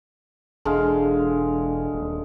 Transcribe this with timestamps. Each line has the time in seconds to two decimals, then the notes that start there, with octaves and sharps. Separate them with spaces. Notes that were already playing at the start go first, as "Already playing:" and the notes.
0.65 E1 D3 G#3 F5
1.93 D#1